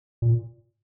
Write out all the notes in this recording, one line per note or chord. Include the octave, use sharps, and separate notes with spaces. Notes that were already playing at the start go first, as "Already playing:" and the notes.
A#2